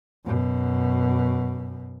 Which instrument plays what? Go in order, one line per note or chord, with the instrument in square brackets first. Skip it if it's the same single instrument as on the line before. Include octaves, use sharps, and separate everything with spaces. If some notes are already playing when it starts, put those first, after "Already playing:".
[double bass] F#2 B2